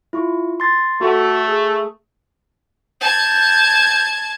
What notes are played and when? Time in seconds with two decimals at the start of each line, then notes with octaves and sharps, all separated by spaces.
0.13 E4 F4 C#6
0.60 C6 A6
1.01 A3 F#4 A4 F#5
1.48 G#4
3.01 A5 G6 G#6